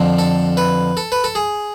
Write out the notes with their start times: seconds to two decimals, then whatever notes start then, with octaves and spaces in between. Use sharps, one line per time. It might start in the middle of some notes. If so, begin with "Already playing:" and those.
Already playing: F2 D3 F3
0.19 A4
0.57 B4
0.97 A4
1.12 B4
1.24 A4
1.35 G#4